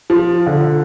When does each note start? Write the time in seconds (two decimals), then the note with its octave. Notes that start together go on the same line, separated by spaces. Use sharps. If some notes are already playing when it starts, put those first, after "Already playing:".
0.10 F3
0.46 D3